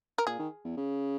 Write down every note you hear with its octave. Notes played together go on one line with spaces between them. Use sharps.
A#4
A#2 G#4
D#3
E2
C#3